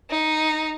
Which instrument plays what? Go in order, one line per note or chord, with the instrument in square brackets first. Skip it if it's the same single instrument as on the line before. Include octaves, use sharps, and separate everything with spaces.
[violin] D#4